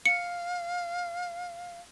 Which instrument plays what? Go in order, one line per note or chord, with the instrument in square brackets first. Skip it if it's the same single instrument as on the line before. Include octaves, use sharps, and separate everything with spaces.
[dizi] F5 [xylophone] C#7